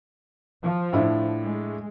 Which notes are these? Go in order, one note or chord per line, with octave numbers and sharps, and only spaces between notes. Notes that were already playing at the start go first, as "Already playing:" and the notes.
F3
A2 D4 E4
G#3